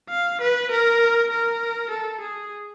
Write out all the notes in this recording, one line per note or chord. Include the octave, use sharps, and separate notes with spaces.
F5
B4
A#4
A#4
A4
G#4